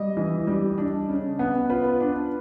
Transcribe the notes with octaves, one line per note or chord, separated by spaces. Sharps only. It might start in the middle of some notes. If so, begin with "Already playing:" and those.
Already playing: G3 D#5
E3
G3
D4
C#3
B3
F4 B4
D4